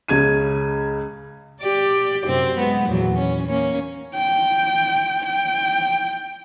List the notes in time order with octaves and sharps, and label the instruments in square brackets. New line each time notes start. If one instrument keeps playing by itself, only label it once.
[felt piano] C#2 C#3 G#6 D#7
[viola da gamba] G4 D5
F#2 C3 C4
G#3 B3
E2 A#2 F#3
C#4
A#3 C#4
[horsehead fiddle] G5
G5